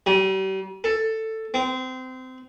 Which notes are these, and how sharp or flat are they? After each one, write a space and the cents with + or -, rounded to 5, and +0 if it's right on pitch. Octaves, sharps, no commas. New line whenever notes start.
G3 -40
A4 +10
C4 -25